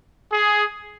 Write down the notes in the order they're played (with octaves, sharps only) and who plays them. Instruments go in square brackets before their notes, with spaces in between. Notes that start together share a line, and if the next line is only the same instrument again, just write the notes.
[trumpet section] G#4